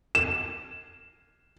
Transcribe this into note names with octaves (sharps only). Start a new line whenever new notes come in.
E7